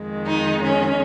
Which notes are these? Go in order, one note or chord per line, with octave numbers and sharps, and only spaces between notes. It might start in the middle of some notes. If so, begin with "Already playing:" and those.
Already playing: F2 D#3 G#3
D#4
C#4